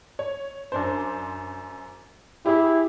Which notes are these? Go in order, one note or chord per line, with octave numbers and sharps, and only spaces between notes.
C#5
F#2 D4 C5
E4 G4 G#4